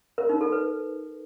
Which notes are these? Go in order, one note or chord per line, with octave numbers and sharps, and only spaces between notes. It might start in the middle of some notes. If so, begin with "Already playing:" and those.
A#4
D#4
A4
B4